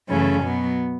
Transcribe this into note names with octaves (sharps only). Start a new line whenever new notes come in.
F#2 C#3 E3 A3 C#4
B2 F#3 B3